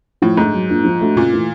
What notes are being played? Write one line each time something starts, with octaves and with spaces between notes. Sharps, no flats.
A2 F3
G#2 A3 D4
F#3
A#3 D4 F4
F3
A3 D4 F#4
A#2 C#3
E3 A3